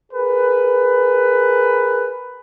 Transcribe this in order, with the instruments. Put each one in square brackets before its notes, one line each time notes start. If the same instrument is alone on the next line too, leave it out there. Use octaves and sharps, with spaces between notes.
[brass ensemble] G#4 A#4 B4